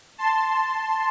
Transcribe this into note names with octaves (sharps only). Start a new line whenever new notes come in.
A5 C6